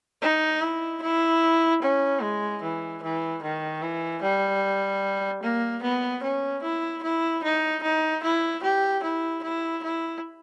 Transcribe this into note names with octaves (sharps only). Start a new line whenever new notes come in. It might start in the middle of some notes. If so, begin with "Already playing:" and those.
D#4
E4
E4
C#4
G#3
E3
E3
D#3
E3
G3
A#3
B3
C#4
E4
E4
D#4
D#4
E4
G4
E4
E4
E4